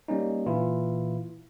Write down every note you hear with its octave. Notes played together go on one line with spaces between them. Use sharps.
G3 A#3 C#4 D#4
A#2 E3 E4 F4